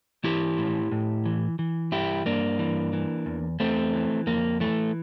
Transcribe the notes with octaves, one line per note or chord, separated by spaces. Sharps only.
E3 E4 G4
A2
A2
E3
E3
G2 E4 G4
G2 A#3 D4
E3
E3
E2
E2 A3 C4
E3
F2 A#3
E3 A3